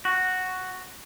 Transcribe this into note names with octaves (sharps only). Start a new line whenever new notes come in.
F#4